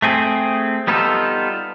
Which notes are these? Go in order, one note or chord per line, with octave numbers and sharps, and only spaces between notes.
A3 C4 G#4
G3 B3 D#4 F4 A4